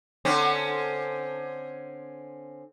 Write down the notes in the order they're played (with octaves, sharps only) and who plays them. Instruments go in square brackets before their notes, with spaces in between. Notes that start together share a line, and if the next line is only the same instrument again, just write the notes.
[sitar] D3 C4 C#4